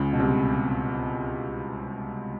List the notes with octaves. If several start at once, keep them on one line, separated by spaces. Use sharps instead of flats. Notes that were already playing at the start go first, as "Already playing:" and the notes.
Already playing: C#2 C#3
B2
C2 C3